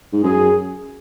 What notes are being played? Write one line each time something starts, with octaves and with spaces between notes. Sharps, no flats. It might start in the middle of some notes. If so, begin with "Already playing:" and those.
G#2
F#2 G#4